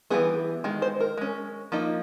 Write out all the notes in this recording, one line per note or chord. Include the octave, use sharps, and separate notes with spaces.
E3 G3 B3 G#4
D#3 G#3
C5
A#4
G#3 C#4
F3 A#3 D#4